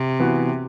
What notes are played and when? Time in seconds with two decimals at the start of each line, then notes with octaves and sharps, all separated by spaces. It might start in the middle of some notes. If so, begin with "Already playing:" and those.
Already playing: C3
0.19 E3 B3 F#4